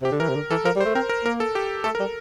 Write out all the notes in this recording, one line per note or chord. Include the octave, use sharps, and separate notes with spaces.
C3 G4
D3
E3 A#4
C3
D3
E3 A4
F3 A#4
G3
C5
A3
C4 A#4
A#4
A#3 A#4
A4
G4
A3 A4
A#4
G3